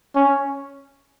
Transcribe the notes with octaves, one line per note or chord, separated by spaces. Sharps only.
C#4